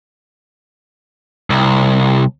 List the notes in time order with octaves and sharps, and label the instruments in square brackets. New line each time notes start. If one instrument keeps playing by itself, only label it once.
[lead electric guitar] C2